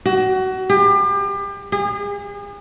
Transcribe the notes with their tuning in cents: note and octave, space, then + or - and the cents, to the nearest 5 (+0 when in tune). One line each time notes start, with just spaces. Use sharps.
F#4 +25
G4 +35
G#4 -40